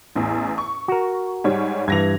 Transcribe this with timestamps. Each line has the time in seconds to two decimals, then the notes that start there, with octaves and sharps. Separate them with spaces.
0.16 A1 E2
0.58 C#6
0.88 F#4 A#4
1.44 G#2 G3 C#5
1.88 G2 E3 G#6 A#6 F7